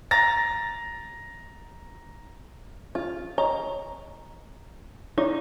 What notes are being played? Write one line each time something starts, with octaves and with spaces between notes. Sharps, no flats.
A#5 A6 A#6
F4
C#5 D#5 A#5
D#4 E4 C#5 D5